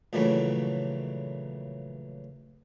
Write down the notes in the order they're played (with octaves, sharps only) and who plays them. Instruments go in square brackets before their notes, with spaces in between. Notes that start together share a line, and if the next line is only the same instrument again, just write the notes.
[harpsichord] A#1 A#2 C#3 E3 F#3 A3